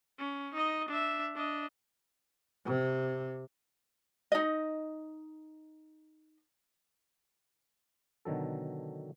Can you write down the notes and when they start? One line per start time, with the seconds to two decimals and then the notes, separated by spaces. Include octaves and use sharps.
0.19 C#4
0.54 D#4 D#5
0.88 D4 E5
1.35 D4 D#5
2.66 C3
4.32 D#4 D#5
8.25 B2 D3 D#3 F#3 A4